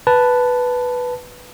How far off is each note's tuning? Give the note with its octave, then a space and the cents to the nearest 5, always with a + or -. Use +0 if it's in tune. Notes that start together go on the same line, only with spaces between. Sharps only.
B4 +0 A5 +0